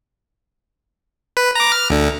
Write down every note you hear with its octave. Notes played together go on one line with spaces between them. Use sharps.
B4
A#5 D6
F6
D2 D3